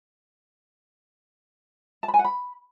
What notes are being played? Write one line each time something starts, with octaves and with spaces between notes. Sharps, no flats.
A5
B5
G#5
F#5
B5